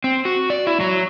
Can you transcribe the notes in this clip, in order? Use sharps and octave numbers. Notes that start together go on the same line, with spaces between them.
C4
F#4
D5
E4
F#3